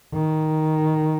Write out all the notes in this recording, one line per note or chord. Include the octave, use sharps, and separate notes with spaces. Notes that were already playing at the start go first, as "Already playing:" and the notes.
D#3